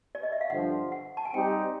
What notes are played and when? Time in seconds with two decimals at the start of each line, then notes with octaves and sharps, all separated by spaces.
0.15 D5
0.23 D#5
0.32 E5
0.41 F5
0.50 G2 D3 F3 F#5
0.92 F#5
1.17 A5
1.25 G#5
1.34 G3 C4 D#4 G4 G5